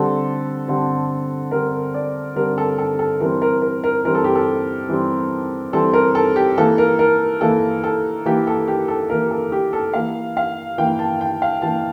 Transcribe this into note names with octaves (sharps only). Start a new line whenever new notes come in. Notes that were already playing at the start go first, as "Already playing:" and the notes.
Already playing: D3 G3 C4 A4
D3 G3 C4
D3 G3 C4 A#4
D5
D3 G3 C4 A#4
A4
A4
A4
E3 G3 C4 A#4
A#4
A#4
A#4
E3 G3 C4 A#4
A4
G4
A4
E3 G3 C4
E3 G3 C4 A4
A#4
A4
G4
E3 A#3 A4
A#4
A#4
E3 A#3 A4
A4
E3 A#3 G4
A4
G4
A4
E3 A#3 A#4
A4
G4
A4
E3 A#3 F5
F5
E3 A#3 G5
A5
G5
F5
E3 A#3 A5